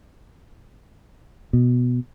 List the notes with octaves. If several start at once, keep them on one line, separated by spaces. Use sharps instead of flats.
B2